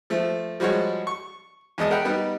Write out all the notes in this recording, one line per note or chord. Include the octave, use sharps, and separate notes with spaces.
F3 A3
F3 G3 G#3 F#4 C#5
C#6
E2 G#3 D#5 A5 D#6
A#4 F#5 G5 B5
G3 B3 D#4